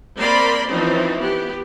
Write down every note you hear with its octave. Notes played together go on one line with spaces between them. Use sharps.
A#3 C4 A#4 D5 B5 C6
E3 F3 C4 C#4 D#4
B3 G4